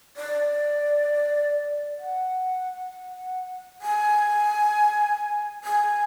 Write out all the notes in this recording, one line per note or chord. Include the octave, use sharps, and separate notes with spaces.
D5
F#5
G#5
G#5